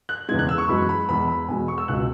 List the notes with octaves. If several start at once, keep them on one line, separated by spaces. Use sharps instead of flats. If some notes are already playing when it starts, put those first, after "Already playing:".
F#6
E2 C#3 E3 G#3 G#6
F#6
E6
C#6
F#2 E3 G#3 B5
B5
E2 E3 G#3 B5
B5
E2 B2 G#3 G#5
C#6
E6
C#2 B2 G#3 F#6